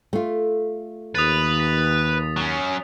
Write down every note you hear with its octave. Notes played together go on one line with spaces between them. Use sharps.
A3 F4
D#2 B4 D#6 A6
B6
F#3 C#4